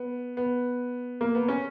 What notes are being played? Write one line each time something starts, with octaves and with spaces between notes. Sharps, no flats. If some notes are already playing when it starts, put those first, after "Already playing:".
Already playing: B3
B3
A#3
B3
C#4